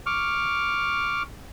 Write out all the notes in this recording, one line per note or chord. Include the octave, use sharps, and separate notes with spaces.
C#6 D6 F6